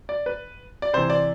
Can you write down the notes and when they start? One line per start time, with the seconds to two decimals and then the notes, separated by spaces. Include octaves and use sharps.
0.09 D5
0.26 B4
0.82 D5
0.93 C3 E3 C5
1.10 D5